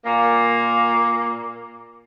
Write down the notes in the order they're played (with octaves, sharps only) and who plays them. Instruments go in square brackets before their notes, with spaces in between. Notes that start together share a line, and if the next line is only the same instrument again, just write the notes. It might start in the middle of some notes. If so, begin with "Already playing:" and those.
[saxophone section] A#2 A#3